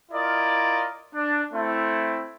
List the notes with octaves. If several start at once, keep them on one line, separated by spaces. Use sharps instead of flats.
E4 F4 A#4 D5 D#5
D4
A3 C4 E4